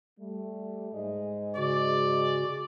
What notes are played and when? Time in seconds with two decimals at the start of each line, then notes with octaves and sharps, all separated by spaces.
0.19 G3 A3
0.93 G#2 G#4 D#5
1.56 C#3 F#4 D5